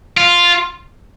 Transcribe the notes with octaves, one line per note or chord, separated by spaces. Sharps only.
F4